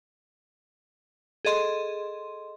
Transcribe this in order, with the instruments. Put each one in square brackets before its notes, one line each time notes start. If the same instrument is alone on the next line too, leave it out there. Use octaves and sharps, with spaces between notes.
[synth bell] G#4 A4 D#5 C6